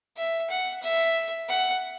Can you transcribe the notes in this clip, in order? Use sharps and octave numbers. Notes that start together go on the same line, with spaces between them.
E5
F#5
E5
F#5